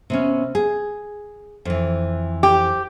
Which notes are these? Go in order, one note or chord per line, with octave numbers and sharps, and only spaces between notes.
C3 B3 C#4
G#4
F2 E3
G4